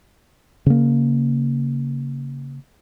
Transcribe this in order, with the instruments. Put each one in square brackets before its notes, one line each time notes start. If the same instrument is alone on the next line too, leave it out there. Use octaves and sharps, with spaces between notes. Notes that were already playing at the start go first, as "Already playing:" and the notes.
[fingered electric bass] C#3 A#3